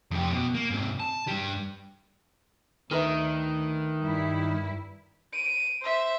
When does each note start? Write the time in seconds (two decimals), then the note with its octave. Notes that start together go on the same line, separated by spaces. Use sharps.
0.11 F2 G4
0.33 B2
0.55 A#3
0.70 G#2 C3
1.00 A5
1.27 G2 G3
2.91 D2 D#3 A#4 B4 E5
4.00 G2 G3 E4
5.33 D7 D#7
5.82 C5 E5